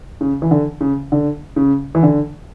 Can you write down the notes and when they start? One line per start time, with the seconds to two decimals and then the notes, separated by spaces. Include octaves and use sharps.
0.21 C#3
0.42 E3
0.51 D3
0.81 C#3
1.12 D3
1.56 C#3
1.95 E3
2.03 D3